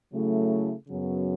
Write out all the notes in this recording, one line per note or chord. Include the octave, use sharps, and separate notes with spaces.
C#3 F#3 A3 E4
F#2 C#3 F#3 B3